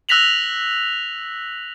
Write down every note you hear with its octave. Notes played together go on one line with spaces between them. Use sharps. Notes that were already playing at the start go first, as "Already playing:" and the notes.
E6 F#6 A#6 B6 F7 F#7